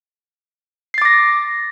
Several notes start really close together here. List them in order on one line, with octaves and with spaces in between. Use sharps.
C7 A6 D6 A#6